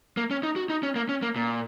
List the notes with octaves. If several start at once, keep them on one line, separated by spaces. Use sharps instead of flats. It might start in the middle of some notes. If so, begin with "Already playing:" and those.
A#3
C#4
D#4
F#4
D#4
C#4
A#3
C#4
A#3
A#2